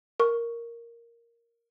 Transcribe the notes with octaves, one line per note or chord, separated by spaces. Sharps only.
A#4 C#6